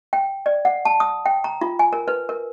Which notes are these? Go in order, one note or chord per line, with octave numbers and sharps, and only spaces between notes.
G5
D5
F#5
A5
D#6
G5
A#5
F4
G#5
A#4
B4
A#4